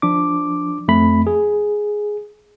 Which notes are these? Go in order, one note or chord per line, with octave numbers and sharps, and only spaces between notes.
F3 D4 D6
F2 A3 B5
G#4